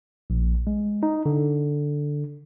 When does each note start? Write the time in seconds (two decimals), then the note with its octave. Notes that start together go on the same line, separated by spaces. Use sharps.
0.30 A#1
0.67 G#3
1.03 D#4
1.26 D3